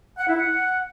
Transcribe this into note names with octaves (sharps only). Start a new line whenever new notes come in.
F#5
E4
F#5